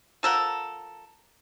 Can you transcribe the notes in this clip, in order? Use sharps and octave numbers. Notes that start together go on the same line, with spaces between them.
F3 A4 A#4 F#5